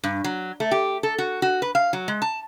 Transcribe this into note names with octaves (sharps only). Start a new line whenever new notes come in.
G2
F#3
A3
G4
A4
F#4
F#4
B4
F5
F#3
G#3
A5